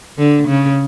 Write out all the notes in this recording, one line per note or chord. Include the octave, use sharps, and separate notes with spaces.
D3
C#3